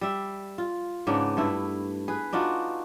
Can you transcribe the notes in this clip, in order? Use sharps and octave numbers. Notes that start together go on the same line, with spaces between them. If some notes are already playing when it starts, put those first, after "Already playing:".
G3 E5
F4
G#2 C#3 B3 D4
G2 A3 E4
G#4 B4
D4 D#4 F4 F#4